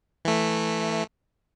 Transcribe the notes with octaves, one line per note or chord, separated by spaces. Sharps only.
E3 A3